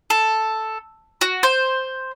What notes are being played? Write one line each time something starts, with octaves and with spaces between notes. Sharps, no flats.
A4
F#4
C5